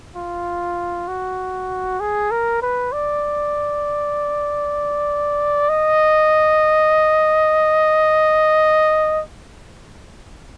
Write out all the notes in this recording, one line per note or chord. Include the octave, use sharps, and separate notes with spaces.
F4
F#4
G#4
A#4
B4
D5
D#5